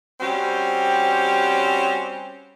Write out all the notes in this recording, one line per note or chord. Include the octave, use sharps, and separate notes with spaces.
G3 C4 C#4 F#4 G4